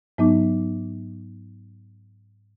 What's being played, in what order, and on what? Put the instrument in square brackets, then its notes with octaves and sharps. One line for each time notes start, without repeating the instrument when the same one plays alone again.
[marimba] G#2 F#3 B3 D#4 D6